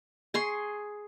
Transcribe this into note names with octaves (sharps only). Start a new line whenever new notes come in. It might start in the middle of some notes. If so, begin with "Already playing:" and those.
G#4 C6 C#6